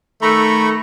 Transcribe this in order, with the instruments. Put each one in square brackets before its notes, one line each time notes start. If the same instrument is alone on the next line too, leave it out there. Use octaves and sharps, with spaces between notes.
[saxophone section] D#3 A3 [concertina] A#5 B5 C#6